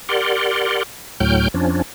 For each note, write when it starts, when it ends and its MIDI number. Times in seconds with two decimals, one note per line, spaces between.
0.09 0.83 67
0.09 0.83 70
0.09 0.83 74
0.09 0.83 78
0.09 0.83 84
1.20 1.48 38
1.20 1.48 45
1.20 1.48 54
1.20 1.48 79
1.20 1.48 89
1.20 1.48 91
1.54 1.82 41
1.54 1.82 53
1.54 1.82 61
1.54 1.82 62